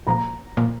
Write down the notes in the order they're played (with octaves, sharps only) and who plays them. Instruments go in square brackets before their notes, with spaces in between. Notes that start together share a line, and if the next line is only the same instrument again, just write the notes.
[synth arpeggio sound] A#2 F3 A#3 [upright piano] A#5
[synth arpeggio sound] A#2 F3 A#3